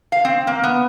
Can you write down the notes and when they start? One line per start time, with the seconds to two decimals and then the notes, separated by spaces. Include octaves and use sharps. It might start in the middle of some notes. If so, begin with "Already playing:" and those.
0.12 F5
0.25 C4
0.47 A#3
0.63 B3